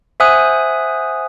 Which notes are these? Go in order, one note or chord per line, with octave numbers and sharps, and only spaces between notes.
C5 E5 F#5 G#5 D#6 F#6